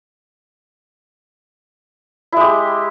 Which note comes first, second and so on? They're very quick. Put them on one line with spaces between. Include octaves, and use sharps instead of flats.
E4 G#3 G4